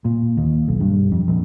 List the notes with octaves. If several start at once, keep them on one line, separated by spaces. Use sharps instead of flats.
A#2
D#2
B1
G2
F2
A#1